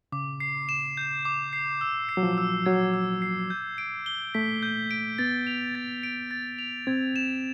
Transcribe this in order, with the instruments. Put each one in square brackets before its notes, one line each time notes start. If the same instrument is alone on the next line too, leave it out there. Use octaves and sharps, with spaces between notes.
[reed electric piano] C#3 [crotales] D6
[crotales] C7
E7
G6
D6
C7
E6
C7
[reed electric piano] F#3
F3
[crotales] E6
[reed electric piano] F#3 [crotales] G#6
[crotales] E6
C7
G6
D7
G7
[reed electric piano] A3 [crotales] B6
[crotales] G6
D7
[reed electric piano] B3 [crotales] A6
[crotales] F7
A6
D7
A6
F7
[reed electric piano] C4 [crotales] G#6
[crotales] E7